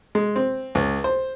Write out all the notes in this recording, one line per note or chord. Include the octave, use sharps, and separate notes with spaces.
G#3
C4
C#2
C5